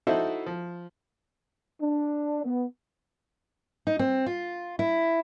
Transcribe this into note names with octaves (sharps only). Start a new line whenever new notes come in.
D#4 E4 F#4 A4 C5 E5
F3
D4
B3
D#4
C4
F4
E4